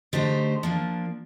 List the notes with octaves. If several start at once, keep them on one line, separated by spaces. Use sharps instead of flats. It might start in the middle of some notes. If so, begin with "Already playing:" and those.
D3 A3 D#4 G4 C5
F3 A#3 D4